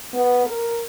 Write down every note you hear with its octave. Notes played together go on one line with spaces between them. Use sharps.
B3
A#4